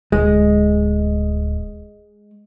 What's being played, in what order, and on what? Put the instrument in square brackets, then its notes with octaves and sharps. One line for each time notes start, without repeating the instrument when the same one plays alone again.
[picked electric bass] D1 [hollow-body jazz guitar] G#3